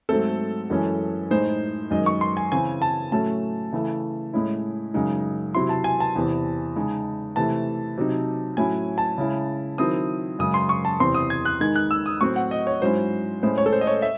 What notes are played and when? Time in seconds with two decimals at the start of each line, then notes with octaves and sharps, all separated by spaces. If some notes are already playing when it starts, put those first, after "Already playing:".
0.09 G#2 F#3 A3 C4 A4
0.70 F#2 E3 G#3 C#4
1.30 A2 G#3 D#4 C5
1.91 F#2 D#3 G#3 D#5
2.06 C#6
2.21 C6
2.37 G#5
2.52 C#3 E3 C4 G#5
2.82 A5
3.12 A2 F#3 A3 C#4 A5
3.72 C#3 E3 A3
4.33 A2 G#3 C#4 E4
4.94 F#2 C#3 G#3 D#4
5.54 C3 F#3 C4 E4 C6
5.69 A5
5.84 G#5
6.00 A5
6.15 E2 C3 E3
6.76 C#3 G#3 D#4
7.36 C3 E3 A3 A5
7.97 C3 F#3 C4 D#4
8.57 A2 F#3 C#4 E4 G#5
8.98 A5
9.18 C#3 G#3 C#4 E4
9.78 D#3 F#3 C4 E4 D#6
10.39 F#2 C#3 G#3 D#6
10.54 C6
10.69 C#6
10.85 A5
11.00 E2 C3 E3 C4 C6
11.15 D#6
11.30 G#6
11.45 F#6
11.60 D#3 G#3 D#4 G#6
11.76 F#6
11.91 E6
12.06 D#6
12.21 A2 F#3 C4 C#6
12.36 F#5
12.51 D#5
12.67 C#5
12.82 G#2 F#3 C#4 E4 C5
13.43 A2 G#3 C#4 E4 C5
13.58 C#5
13.66 A4
13.73 C5
13.81 D#5
13.87 C#5
14.02 E5